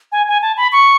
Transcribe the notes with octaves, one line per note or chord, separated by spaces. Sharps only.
G#5
G#5
A5
B5
C#6